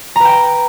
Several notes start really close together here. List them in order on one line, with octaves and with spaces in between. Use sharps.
A#5 B4 G5